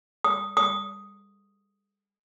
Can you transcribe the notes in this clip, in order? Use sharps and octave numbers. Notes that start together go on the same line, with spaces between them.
D#6
D#6